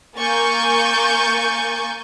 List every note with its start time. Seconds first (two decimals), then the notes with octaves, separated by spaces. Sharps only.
0.16 A#3 G#5 C#6 G6 A6